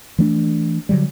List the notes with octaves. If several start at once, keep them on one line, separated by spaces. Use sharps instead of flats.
E3 A3 D4
D3 F#3 G3